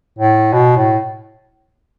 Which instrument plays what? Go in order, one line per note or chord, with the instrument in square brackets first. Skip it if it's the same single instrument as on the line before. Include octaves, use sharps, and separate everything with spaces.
[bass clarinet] A2
B2
A2